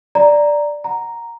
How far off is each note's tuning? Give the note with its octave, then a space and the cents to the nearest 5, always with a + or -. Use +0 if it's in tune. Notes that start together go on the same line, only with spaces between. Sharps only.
D5 +0 A#5 +0
F#5 +0 A#5 +0